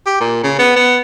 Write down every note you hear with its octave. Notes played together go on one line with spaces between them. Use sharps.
G4
A#2
C#3
B3
B3